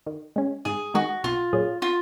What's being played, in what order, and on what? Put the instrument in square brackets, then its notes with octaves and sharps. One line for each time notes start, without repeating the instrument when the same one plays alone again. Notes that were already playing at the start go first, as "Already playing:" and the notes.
[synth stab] D#3
G#3 C#4
[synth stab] G#2 [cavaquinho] G#4
[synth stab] D#3 G#3 D#4 G#4 [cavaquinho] F#4
[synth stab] B1 [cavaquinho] F4
[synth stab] A#2 F#3 C#4 G#4
[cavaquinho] F4